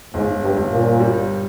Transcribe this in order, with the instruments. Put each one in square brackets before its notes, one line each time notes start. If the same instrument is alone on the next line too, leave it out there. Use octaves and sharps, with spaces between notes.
[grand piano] G1 [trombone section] G#2
[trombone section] G2
[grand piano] G1
[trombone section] A#2
[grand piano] G3